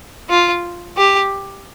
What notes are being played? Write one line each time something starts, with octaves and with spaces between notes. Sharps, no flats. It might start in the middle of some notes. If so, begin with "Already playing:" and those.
F4
G4